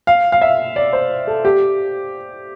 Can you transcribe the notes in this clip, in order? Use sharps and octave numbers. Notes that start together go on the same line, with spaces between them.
F5
F5
E5
D5
C5
A4
G4